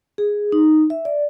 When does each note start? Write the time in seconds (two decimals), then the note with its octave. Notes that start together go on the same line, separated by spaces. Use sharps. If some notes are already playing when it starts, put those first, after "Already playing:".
0.18 G#4
0.52 D#4
0.90 E5
1.05 D5